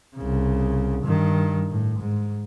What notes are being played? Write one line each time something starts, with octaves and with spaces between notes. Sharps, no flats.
C2 C#3
G2 D#3
A2
G#2